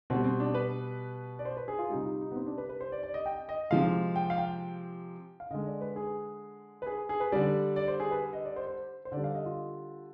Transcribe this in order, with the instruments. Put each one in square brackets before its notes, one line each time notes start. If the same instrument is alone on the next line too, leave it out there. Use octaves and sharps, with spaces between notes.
[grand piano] B2 G3 C4
C4
D4
B4
D5
C5
B4
G#4
F4
C3 G3 D#4
F4
D#4
B3
C4
D4
B4
B4
C5
D5
D5
D#5
G5
D#5
C3 F3 G#3 F5
G5
F5
G5
F5
D3 G#3 D#5
D5
B4
G#4
B4
G#4
G#4
B4
D3 G3 D5
D5
C5
G#4
B4
D#5
D5
C5
C5
C5
D3 G3 D5
F5
D#5
F4